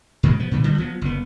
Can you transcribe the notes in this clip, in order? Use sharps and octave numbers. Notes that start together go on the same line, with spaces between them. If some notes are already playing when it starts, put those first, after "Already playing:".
G#2 B2 F#3
F3 B3
A#2 D3 F3
D3 G3
F3 F#3 B3
F#1 B3